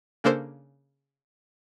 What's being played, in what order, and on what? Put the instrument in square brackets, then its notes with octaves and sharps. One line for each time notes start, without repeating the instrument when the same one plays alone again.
[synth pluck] C#3 A#3 D4 A4 A#4 C5